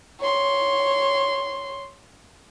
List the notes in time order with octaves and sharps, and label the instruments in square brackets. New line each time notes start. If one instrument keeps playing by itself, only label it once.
[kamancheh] C#5 C6